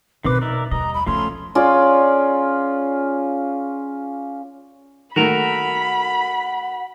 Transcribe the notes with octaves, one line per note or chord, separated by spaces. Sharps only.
B2 D#3 E3 C4 B4 D6
D#4 A#4 D5 E5
D#2 G3 D#5 A#5
B5
C#3 F3 A3 B3 C#4 C6
C#4 F4 G#4 D5
D#3 A3 A#3 F#4 A#4 F#5 B5